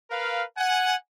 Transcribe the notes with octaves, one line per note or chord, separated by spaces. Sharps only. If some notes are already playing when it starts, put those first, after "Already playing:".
A#4 B4 F5
F#5 G#5